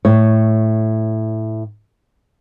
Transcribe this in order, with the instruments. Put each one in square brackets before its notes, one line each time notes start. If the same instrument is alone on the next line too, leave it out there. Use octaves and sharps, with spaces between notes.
[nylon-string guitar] A2 C#5